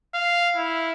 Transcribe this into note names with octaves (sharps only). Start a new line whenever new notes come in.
F5
E4